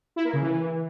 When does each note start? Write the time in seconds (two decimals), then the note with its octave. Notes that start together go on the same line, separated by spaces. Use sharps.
0.16 E4
0.25 A#3
0.33 C#3
0.42 E3